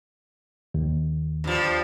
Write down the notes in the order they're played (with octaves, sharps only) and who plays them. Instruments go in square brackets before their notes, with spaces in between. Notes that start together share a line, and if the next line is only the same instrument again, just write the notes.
[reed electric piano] D#2
[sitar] G2 F3